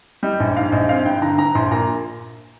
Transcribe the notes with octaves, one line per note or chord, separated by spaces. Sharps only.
G3 D#5
A#1
G#2 F5
A#1 D#5
C4 F5
G2 G5
D3 A#5
G2 A#5
A#1 C6
A#2 A#5